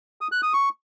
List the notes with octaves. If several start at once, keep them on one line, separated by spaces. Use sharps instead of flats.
D#6
F#6
D#6
C#6